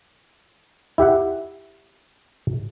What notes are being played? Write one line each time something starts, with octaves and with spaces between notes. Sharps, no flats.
E4 G4 E5 F#5